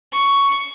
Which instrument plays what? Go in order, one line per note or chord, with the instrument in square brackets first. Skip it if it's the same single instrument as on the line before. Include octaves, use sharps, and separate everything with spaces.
[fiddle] C#6